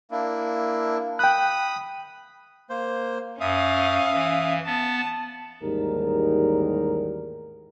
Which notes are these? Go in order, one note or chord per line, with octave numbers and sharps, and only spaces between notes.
A#3 D4 E4
G5 B5 D#6 F#6
A#3 C5
F#2 C#4 E5 F5 D#6
E3
B3 A5
A1 D#2 G#2 G3 D#4 A#4